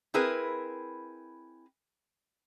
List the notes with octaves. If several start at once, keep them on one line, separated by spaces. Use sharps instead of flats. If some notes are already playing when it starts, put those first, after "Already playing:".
C4 E4 G#4 A#4 B4